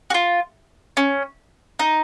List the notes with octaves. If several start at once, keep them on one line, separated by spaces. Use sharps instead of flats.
F#4
F4
C#4
D#4